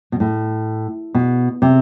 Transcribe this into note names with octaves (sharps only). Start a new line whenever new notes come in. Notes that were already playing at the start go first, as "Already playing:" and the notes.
B2
A2
B2
C3